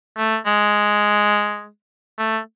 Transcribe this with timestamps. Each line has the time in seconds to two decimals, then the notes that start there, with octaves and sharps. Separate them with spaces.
0.17 A3
0.46 G#3
2.19 A3